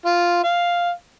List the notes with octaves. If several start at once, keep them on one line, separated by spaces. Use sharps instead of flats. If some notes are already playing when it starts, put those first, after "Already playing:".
F4
F5